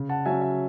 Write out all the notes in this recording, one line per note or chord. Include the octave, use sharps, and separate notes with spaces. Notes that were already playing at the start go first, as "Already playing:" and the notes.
Already playing: C#3
F#5 A5
F#3 C#4 E5 G#5
E5